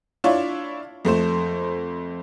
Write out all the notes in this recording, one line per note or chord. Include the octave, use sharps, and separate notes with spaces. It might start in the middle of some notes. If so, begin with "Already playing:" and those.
D4 E4 F4 C#5 D5
F2 A3 C5 E7